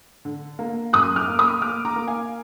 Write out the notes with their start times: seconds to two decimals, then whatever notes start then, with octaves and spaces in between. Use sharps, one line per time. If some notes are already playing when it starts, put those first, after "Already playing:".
0.25 D3
0.59 A#3
0.93 F#2 D#6 F#6
1.16 D6 F6
1.28 A#3
1.39 B5 D#6
1.62 A#3 D6 F6
1.85 A#5 D6
1.96 A#3
2.08 F5 G#5